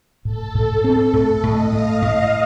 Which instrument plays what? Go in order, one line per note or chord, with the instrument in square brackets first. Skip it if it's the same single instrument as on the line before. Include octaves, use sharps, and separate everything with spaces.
[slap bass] A2 [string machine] A4
[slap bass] A2
C4
A2
[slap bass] A2 [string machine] D#5
[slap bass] A2 [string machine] F5
[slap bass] A2 [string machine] D#5